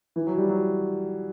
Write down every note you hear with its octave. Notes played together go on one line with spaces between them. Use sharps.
E3
F#3
G3
F#3